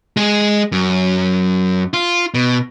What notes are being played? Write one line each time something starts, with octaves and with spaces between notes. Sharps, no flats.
G#3 G#4
F#2
F4
B2